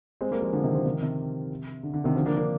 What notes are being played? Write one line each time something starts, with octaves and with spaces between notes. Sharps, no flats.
G#3 C4
G3 A#3
F3 G#3
D3 F3
C3 D#3
D3 F3
C3 D#3
C3
D3
D3
C3 D#3
D3 F3
A#3 D4
A#3 D4